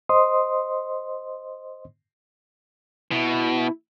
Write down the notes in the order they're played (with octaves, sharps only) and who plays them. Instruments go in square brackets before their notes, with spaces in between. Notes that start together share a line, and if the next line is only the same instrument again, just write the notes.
[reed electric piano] C5 D#5 C6 D#6
[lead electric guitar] B2 [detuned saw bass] E4